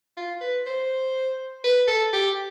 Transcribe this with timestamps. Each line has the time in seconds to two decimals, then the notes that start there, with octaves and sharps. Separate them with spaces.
0.17 F4
0.41 B4
0.66 C5
1.64 B4
1.87 A4
2.13 G4